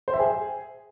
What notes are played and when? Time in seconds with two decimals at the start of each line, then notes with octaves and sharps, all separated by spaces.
0.08 C5
0.14 E5
0.19 G#4